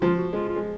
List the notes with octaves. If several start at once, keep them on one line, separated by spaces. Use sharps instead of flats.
F3 F4
F#4
G#3 F4
F4
G#3